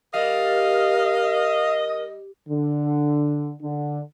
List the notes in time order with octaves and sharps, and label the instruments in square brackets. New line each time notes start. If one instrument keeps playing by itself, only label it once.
[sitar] G3 [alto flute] A#4 [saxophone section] D#5 [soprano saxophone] F5
[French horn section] D3
D3